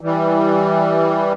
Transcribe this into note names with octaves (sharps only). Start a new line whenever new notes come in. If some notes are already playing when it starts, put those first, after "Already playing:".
E3 G3